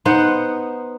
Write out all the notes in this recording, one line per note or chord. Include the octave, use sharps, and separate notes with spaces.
B3 D#4 C5 F#5